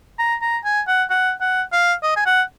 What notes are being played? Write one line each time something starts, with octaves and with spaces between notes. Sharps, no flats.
A#5
A#5
G#5
F#5
F#5
F#5
F5
D#5
G#5
F#5